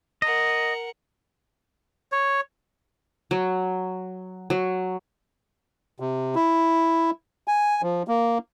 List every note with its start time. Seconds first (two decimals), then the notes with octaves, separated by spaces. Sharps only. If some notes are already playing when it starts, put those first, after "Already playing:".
0.22 A#4 D#5 F#5
2.12 C#5
3.31 F#3
4.50 F#3
6.00 C3
6.35 E4
7.48 G#5
7.82 F3
8.08 A#3